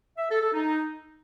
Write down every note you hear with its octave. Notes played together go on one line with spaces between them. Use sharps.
E5
A4
A4
D#4